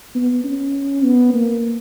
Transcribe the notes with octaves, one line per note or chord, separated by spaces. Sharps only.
B3
C#4
B3
A#3